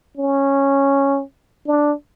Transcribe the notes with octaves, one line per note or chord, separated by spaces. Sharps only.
C#4
D4